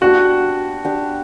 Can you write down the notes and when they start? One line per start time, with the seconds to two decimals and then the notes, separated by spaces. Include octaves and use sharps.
0.01 B3 D4 F#4 G4
0.85 B3 D4 G4